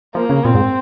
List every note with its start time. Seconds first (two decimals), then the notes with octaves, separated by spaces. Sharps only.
0.15 F3 A#3
0.29 C#3
0.45 A#2 C4
0.55 G#2